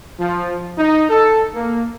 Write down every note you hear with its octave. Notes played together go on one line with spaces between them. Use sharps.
F3
D#4
A4
A#3